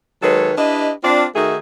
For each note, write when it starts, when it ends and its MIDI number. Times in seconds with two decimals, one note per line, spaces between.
0.22 0.52 51
0.22 0.52 54
0.22 0.52 56
0.22 0.52 69
0.22 0.52 71
0.22 0.52 73
0.57 0.91 62
0.57 0.91 64
0.57 0.91 67
0.57 0.91 71
0.57 0.91 75
1.04 1.26 60
1.04 1.26 62
1.04 1.26 65
1.35 1.56 51
1.35 1.56 57
1.35 1.56 63
1.35 1.56 66
1.35 1.56 68
1.35 1.56 76